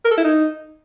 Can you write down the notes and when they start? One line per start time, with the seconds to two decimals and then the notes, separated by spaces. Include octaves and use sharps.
0.05 A#4
0.11 A4
0.18 E4
0.24 D#4